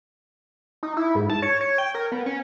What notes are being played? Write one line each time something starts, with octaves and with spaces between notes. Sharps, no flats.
D#4
E4
G#2
A5
C#5
C#5
G5
A#4
B3
C#4